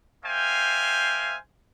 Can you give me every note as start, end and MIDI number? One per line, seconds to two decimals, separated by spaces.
0.25 1.36 58
0.25 1.36 72
0.25 1.36 76
0.25 1.36 77
0.25 1.36 79
0.25 1.36 80